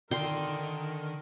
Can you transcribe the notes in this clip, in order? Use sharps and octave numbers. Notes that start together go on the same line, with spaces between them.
D3 D#3 A#4 G5 C6